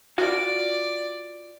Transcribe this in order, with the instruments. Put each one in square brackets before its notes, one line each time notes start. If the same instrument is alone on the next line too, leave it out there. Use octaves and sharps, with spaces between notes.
[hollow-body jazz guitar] F4 F#4 F5 [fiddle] D5